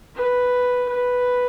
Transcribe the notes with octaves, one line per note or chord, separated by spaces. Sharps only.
B4
B4